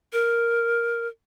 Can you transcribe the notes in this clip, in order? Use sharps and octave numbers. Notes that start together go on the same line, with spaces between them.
A#4